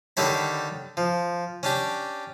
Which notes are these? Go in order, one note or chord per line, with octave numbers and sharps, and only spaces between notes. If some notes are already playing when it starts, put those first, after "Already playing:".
D3 D#3 G3 D4 C#5 B5
F3
C#4 D4 G4